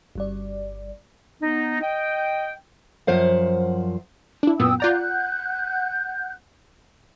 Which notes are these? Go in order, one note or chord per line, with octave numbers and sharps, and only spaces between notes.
G1 G3 D5
B3 D#4
D#5 G5
F#2 F3 C5 F5 F#5
D4 E4
F#2 A#2 B3 G5 D#6 E6
F4 D5 F#5 A#5 F#6 G6